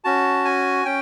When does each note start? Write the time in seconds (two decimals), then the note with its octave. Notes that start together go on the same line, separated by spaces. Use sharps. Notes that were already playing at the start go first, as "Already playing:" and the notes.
0.04 C#4 F#4 A5
0.45 G#5
0.85 C#4 G5